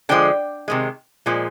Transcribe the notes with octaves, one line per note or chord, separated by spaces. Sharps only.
D3 F3 G#3 G5
C3 D#3 G#3
A#2 F3 G#3